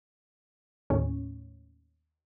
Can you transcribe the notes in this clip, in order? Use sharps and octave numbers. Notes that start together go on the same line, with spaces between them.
D#2 A2 C#4